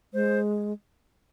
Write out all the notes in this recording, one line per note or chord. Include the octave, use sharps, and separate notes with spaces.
G#3 C5